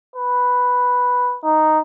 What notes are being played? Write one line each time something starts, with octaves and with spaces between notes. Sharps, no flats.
B4
D#4